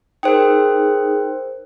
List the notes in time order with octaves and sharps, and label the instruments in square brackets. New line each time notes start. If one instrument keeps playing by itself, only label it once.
[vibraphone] D#4 G#4 [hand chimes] A#4 C5 G5